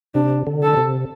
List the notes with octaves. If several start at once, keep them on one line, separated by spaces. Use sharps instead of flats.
C3 D4
D3
A4
C3